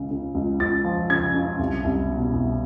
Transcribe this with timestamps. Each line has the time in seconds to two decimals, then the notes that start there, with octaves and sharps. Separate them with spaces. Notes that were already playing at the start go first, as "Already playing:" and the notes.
Already playing: C#2 C#3
0.11 C#3
0.35 C#2
0.60 C#2 A6
0.84 F3
1.10 C#3 G#6
1.34 C#3
1.59 C2
1.84 C2
2.09 B2
2.34 C2